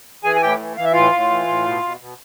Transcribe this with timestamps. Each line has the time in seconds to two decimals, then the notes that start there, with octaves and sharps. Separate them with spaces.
0.24 E3 G#4 G#5
0.36 G#5
0.42 A2 G4 G5
0.59 E3
0.77 E3 F5
0.85 E5
0.93 A2 F4 F5
1.13 A2
1.30 E3
1.48 A2
1.65 B2
1.83 B2
2.00 B2